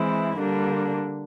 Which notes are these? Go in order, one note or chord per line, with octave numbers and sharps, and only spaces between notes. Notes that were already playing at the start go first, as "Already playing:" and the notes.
Already playing: E3 G#3 C4 E4
D3 G3 A#3 D4